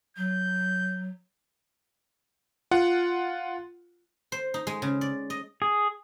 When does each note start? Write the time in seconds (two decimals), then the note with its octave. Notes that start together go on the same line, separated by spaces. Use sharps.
0.17 F#3 G6
2.71 F4 F#5
4.32 C5
4.54 D#4
4.67 G#3
4.82 C#3
5.01 D5
5.30 D#5
5.62 G#4